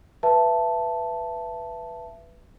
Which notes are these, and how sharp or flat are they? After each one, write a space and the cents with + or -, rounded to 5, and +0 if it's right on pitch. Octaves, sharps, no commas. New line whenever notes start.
B4 +0 E5 +25 A5 +0